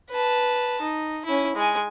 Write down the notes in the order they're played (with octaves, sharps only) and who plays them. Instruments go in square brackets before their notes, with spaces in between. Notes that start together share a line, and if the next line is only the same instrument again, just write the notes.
[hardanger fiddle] B4 A5
D#4
C#4 E4
G#3 G#5